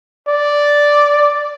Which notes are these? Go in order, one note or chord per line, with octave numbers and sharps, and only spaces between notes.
D5